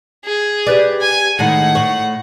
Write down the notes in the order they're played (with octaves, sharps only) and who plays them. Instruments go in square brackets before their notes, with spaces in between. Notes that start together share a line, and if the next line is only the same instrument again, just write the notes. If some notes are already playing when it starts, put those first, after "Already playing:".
[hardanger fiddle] G#4
[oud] G4 B4 D5
[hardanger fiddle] G#5
[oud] A2 D#3 G#3 [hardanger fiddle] F#5
[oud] A2 C#5